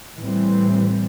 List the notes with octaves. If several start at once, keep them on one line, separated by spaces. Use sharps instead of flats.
A2 E3 G3 C4